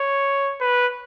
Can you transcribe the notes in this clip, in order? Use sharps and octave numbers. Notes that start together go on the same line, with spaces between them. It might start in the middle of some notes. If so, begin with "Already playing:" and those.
Already playing: C#5
B4